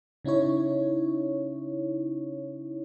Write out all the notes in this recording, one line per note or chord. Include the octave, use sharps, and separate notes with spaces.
C#3 C#4 D#4 E4 C#5